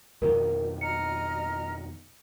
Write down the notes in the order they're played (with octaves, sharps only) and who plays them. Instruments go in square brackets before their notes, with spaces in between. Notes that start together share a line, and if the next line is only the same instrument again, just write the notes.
[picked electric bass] F2 B2 D#3 [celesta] A#4
[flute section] D#5 A#5 F6 [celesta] C#7